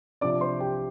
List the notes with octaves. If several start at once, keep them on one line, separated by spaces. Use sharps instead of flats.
C3 F3 D4 D5 D6
C5 C6
G4 G5